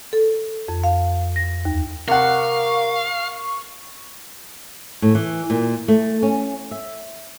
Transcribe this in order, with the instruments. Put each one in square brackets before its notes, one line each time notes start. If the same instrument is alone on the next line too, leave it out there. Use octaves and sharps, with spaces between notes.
[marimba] A4
F2
F5
A#6
D#2
[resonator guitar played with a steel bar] C3 F#5 [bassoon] A#4 [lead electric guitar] F5 [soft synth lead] C#6
[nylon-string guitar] A2
E3
A#2
A3
C#4
E5